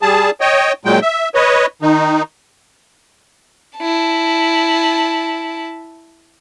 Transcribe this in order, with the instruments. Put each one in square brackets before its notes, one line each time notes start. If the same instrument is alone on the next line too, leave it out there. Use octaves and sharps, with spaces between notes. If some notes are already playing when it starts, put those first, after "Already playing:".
[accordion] G3 G#4 A5
C#5 D#5 G5
A#2 F#3 G#3 G5
E5
B4 C#5 D#5
D#3 D#4
[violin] E4 A5